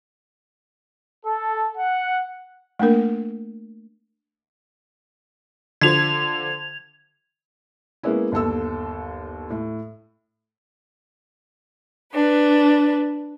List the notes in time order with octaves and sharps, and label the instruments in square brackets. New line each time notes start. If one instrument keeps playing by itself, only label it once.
[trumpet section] A4
F#5
[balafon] A3 A#3 D4 A#4
[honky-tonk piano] D3 F3 [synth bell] G#6 F7
[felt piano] G#3 A#3 B3 C#4 E4
G1 D#2 A4 E6
A2
[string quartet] D4 B4